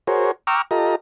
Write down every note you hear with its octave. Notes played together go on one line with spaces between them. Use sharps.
F#4 G#4 A#4 C5 C#5
G5 A#5 C#6 D6 E6 F6
F4 G4 A4 D#5 A#5